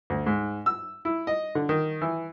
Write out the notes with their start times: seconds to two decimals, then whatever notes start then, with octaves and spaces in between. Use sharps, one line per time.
0.10 D2
0.26 G#2
0.66 E6
1.05 E4
1.27 D#5
1.55 D3
1.69 D#3
2.01 E3